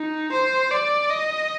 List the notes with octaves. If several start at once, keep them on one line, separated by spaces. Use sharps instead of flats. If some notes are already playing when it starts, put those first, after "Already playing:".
Already playing: D#4
C5
D5
D#5